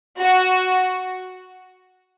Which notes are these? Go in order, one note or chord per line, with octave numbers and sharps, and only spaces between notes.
F#4